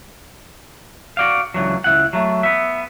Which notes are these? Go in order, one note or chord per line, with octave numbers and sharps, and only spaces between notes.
F#4 D5 F5
C#2 D3 E3 F#3
C#2 E4 F#5
F#3 A3
B3 E5